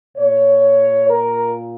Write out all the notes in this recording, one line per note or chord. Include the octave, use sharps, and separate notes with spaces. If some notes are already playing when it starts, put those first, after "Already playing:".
A#2 C#5
A#4